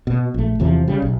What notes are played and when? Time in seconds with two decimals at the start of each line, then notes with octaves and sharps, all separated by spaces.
0.07 B2
0.34 A#1 A3
0.60 E2 C3 E3 F3
0.88 C#3 G3
1.02 B1